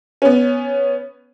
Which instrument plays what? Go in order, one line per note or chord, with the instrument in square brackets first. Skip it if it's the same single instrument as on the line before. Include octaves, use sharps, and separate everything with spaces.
[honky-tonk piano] B3 C#4